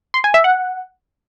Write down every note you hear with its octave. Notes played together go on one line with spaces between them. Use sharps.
C6
G#5
E5
F#5